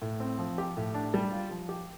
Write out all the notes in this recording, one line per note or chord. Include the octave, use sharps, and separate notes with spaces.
A2
C4
F3
G4
A2
D4
G3
F4
F3
G4